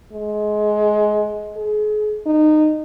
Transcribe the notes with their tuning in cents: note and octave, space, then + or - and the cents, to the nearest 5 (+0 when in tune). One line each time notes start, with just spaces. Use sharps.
G#3 +20
G#4 +35
D#4 -20